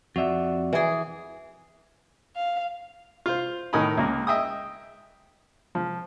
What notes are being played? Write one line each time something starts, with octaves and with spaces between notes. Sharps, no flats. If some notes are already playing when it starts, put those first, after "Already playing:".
F2 F#4 D5 E5 F#5
E3 G#4
F5
F4 C5
A2 D#3 A#4 D#5 G#5 B5
C#2 A#3
D#5 E5 G5 D#6
F3